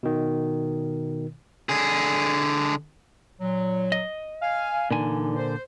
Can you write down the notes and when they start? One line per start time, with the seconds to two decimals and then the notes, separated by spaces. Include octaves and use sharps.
0.03 B2 D#3
1.69 D3 G#4
3.40 A#2 F#3
3.92 D#5
4.42 F5 G#5
4.91 A#2 D3 E3 D#4 G#5
5.36 C5